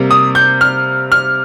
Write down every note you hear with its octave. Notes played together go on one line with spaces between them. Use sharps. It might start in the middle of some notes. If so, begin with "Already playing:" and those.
Already playing: C3 G3 A#3
D#6
G6
F6
F6